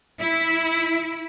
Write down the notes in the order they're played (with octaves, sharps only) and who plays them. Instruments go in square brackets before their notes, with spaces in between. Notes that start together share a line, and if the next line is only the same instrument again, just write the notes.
[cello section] E4